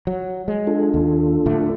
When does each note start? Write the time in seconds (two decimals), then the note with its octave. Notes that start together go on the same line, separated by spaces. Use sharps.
0.07 F#3
0.48 G#3
0.67 D4 F4 A4
0.94 D#2
1.46 A2 D3 A3